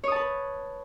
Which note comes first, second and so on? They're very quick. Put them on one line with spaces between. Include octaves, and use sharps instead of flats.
C#5 D#6 A5 B4